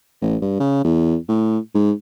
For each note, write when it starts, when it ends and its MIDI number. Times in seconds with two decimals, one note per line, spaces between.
0.22 0.36 33
0.42 0.55 43
0.60 0.81 49
0.84 1.16 40
1.28 1.58 45
1.75 1.92 44